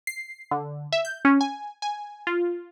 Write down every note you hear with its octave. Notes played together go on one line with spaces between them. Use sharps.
C7
D3
E5
G6
C#4
G#5
G#5
F4